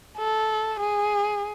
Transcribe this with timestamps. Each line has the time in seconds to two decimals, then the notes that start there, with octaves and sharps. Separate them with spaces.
0.18 A4
0.80 G#4